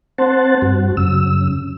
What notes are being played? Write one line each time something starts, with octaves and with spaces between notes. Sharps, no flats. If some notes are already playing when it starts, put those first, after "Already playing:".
C4 C5 F#5 A5
G2 F#4
F#2 C#3 E6